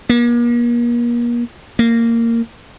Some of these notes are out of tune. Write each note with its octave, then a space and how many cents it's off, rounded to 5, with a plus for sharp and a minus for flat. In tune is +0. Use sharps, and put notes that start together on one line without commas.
A#3 +40
A#3 -15